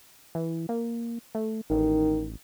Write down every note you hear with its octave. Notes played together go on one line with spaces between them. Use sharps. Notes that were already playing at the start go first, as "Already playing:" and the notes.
E3
A#3
A3
A1 D#3